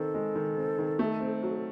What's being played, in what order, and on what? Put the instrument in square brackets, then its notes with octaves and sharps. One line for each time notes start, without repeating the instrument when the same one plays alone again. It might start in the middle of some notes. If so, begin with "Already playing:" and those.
Already playing: [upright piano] D#3 C4 [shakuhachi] A4
[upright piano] G#3
D#3
C4
D#3
A3
C4
F#3